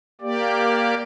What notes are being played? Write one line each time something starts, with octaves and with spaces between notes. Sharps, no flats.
A#3 G4 D5